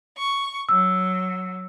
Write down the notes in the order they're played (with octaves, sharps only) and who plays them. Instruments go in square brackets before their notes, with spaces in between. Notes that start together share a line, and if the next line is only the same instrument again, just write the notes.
[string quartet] C#6
[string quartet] F#3 [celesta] E6